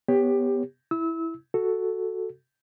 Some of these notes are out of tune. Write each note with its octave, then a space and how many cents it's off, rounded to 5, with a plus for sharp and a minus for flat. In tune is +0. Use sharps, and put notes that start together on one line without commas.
B3 +0 G4 +15 C#5 +0
E4 +0 E6 -30
F#4 +0 A4 +0